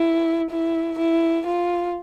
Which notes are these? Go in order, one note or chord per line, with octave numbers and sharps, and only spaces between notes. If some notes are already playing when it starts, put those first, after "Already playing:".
Already playing: E4
E4
E4
F4